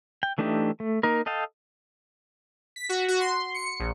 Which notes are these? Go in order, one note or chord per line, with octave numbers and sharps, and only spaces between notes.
G5
E3 A3 D4 D#4 G4
A3
A#3 D#4 A#4
A4 D#5 F5 G5 A5
B6
F#4
F#4
C6
C#7
A#1